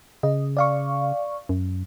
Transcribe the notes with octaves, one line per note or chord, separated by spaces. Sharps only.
C#3 D#5
D5 F5 C#6
F#2